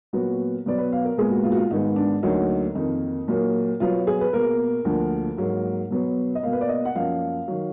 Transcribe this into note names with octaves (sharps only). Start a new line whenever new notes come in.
A#2 F#3 B3 F#4
B2 F#3 B3 D5
B4
F5
A#4
A#2 G#3 B3 G#4
F#4
F4
F#4
F4
G#2 D#3 G#3 B3 D#4
D4
D2 D3 F#3 A#3 D#4
F2 D#3 A#3 D#4
A#2 F#3 A#3
B2 F#3 B3 F4
G#4
B4
B2 A#3 A#4
D2 D3 F3 A#3
G#2 F#3 A#3
B2 F#3 B3
D#5
B2 A#3 F5
B4
D5
D#5
F#5
F#2 F3 A#3 F5
D#3 F#3